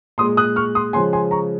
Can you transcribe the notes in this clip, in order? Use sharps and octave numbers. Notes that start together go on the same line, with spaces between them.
A#2 G#3 C6 D#6
D#6 F#6
C#6 F6
C6 D#6
C#3 F3 G#3 G#5 C6
G#5 C6
A#5 C#6